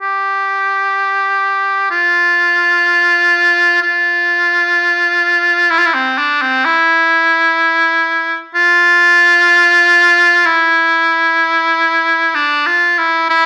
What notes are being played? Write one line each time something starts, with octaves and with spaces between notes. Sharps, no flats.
G4
F4
F4
E4
F4
E4
C4
D4
C4
E4
F4
E4
D4
F4
E4
E4